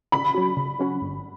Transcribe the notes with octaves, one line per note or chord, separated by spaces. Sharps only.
C#3 B5
F#3 C#4 F#4
C#3
F#3 C#4 F#4
G1